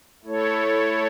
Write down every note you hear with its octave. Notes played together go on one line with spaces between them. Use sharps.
A3 E4 A4 C#5